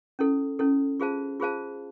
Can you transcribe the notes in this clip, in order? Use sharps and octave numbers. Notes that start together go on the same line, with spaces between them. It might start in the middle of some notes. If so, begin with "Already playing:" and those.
C#4 E4 A4
C#4 E4 A4
F4 G#4 C5 F5 A5
F4 G#4 C5 F5 A5